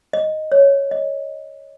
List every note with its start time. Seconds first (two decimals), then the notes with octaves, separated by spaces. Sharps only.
0.13 D#5
0.52 C#5
0.91 D#5